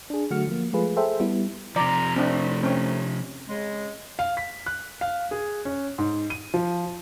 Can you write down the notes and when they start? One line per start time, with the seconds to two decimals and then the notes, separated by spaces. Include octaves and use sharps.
0.10 D4 G#4
0.31 D3 F#3 A3 F#4 F6 C#7
0.48 F3 A#3
0.73 F3 G#3 A3 F4 G#4 B4
0.97 G#4 A4 C5 E5 G5
1.20 G3 B3 E4
1.76 C3 F3 D5 A#5
2.16 A2 D#3 A3 C4 D4
2.63 C4 C#4
3.49 C#3 G#3
4.19 F5
4.37 B6
4.66 F#6
5.01 F5
5.31 G#4
5.65 C#4
5.98 G#2
6.30 D#7
6.54 F3